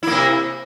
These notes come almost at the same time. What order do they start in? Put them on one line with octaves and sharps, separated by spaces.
E4 A#3 C3